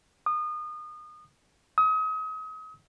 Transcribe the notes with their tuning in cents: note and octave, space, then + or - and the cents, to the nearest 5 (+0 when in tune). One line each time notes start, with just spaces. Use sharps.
D#6 -30
D#6 +35